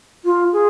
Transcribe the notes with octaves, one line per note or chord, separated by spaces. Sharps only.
F4
G#4